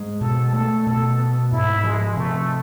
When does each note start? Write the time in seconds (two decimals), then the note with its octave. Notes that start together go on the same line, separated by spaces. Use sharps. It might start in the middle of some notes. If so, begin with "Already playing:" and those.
Already playing: G#2 G#3
0.21 B2 A4
0.53 A3 A4
0.86 B2 A4
1.19 B3
1.52 G#2 E4
1.84 F3 G#3
2.16 C3 A3